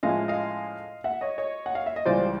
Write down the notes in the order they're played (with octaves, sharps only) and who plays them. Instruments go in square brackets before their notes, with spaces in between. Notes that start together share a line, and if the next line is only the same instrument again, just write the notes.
[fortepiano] A2 F3 G#3 C#4 E4 D#5 F5
D#5 F5
E5 F#5
C#5 D#5
C#5 D#5
F#5
F5
E5
D#5
C#2 C#3 E3 G3 C5 D5